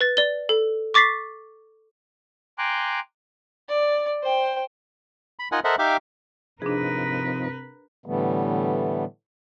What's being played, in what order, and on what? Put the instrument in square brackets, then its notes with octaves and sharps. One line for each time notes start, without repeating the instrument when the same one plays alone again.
[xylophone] B4 A6
D5 G7
A4
C#6 D6 A6 B6 C7
[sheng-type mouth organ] G5 G#5 A#5 C6 D6 F#6
[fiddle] D5
C5 G5
[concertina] B5
D#4 F4 A#4 D#5 F#5 G#5
A4 A#4 C5 D#5 E5 F#5
D#4 G4 E5 F5 G5 D6
[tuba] C3 [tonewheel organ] F3 C4 D#4 [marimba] D4 G#4 [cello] A#4 B4
[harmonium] A2 D3 E3 G3 A3 B3